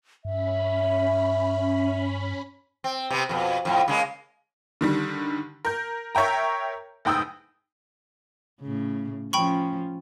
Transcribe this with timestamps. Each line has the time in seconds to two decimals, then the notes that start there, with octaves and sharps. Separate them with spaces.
0.25 G2 C#4 E5 B5
2.84 C4
3.10 C3 B3
3.29 F2 B2
3.65 F2 A2
3.88 C#3 G#3 A#3
4.81 D3 D#3 G3
5.65 A#4 G6
6.15 A#4 C#5 E5 G5 A#5
7.05 F1 G#2 G5 D#6 E6
8.61 A2 C#3
9.33 F3 C#4 G5 B5 C#6